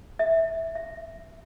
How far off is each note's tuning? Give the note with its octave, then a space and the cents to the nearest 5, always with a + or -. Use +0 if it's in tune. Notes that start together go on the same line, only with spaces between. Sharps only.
E5 -10
E5 +35